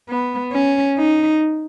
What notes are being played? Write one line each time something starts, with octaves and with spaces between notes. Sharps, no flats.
B3
C#4
D#4